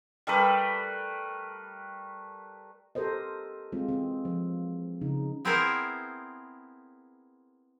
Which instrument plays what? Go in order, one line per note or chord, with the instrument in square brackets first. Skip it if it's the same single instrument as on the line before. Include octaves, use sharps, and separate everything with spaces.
[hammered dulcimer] G3 A3 A#4 B4
[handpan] G4 A4 A#4 C5 D#5
G#3 C4 F4
E3 C4
F3
C#3 D#4
[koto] B3 C4 E4 G#4 A#4 C5